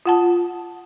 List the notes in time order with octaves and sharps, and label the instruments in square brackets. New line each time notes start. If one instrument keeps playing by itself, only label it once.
[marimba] F4 F#5 A5